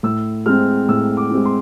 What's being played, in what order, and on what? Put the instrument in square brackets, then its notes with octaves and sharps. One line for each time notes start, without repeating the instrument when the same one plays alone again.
[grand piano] A2 E6
G#3 C4 F6
A2 E6
D6
G#3 C4
C6